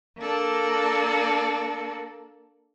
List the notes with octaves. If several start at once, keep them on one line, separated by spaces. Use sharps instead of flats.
A#3 D4 A4